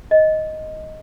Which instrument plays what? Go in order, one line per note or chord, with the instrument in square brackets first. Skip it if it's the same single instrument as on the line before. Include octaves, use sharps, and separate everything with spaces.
[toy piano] D#5